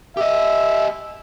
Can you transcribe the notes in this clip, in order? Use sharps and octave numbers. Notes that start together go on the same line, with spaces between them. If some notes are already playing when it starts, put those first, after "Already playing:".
G4 D#5 E5